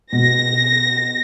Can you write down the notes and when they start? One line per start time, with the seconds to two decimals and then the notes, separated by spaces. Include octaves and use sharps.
0.13 B2 A#6